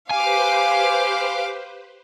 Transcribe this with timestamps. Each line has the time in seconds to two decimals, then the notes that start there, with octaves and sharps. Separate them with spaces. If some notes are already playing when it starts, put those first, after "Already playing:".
0.11 G4 B4 C5 F5 G#5 D6